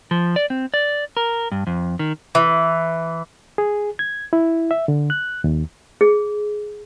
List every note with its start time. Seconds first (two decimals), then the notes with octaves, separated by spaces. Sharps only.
0.11 F3
0.36 D5
0.50 C4
0.74 D5
1.17 A#4
1.52 G2
1.67 F2
1.99 D#3
2.35 E3
3.58 G#4
3.99 G#6
4.33 E4
4.71 E5
4.88 D3
5.10 F#6
5.44 D#2
6.01 G#4